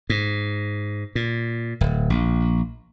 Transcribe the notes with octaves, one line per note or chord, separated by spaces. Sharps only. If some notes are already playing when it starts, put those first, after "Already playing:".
G#2
A#2
D1
A#1